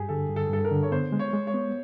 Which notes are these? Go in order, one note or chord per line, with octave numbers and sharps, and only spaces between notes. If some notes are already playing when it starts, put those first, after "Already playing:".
Already playing: G2 G4 G#4
D3 A4
G2
A4
G2 A4
A#4
D3
C#5
B3 C5
G#3
C#5
G#3
C#5
B3